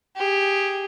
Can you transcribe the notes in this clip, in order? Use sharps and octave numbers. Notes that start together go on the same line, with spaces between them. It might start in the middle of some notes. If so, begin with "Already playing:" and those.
G4 G#4